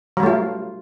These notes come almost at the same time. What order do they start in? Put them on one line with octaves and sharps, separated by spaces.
F#3 G3 A3 F4